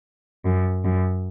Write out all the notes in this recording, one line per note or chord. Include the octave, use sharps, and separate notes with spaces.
F#2
F#2